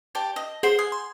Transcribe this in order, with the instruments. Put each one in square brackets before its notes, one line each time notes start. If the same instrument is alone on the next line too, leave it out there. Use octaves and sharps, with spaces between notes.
[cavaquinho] G4 D5 A5
D#5
[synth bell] G#4 F#5 C7 [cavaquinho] C5
[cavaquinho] G#5 [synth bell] D#6
[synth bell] C6